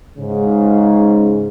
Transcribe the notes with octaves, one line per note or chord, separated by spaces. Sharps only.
G#2 C#3